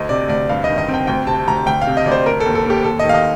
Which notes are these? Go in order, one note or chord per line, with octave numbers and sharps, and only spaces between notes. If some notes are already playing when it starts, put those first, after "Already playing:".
Already playing: D2 A3 D#5
C3 D5
D2 D5
G2 F5
D#5
D#3
D#5
C4
G5
D2 G5
C3 A5
D2 A#5
D2 G5
F5
C3
D#5
D2 D5
C5
F1 A#4
A4
D#2
A4
A#3 G4
D#2 A4
D#3 D#5
F5
D#5